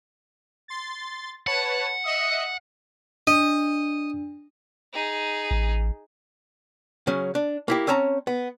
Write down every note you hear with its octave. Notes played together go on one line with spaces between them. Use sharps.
C6 A6
B4 C#5 F#5 A5
D#5 E5 D#6
D4 D#5
D#4 G#4
A1
C#3 F#3 C#4
D4
A#3 E4 G4
C4 C#4 C#5 A5 A#5
B3